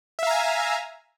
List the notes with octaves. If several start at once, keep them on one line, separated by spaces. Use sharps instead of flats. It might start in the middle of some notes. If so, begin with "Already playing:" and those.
E5 F5 G#5 A#5